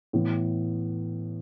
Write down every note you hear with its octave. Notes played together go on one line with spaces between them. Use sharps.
A2 E3 B3